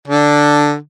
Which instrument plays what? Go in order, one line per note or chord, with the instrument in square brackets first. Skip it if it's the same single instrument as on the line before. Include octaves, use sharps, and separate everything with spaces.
[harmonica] D3 D4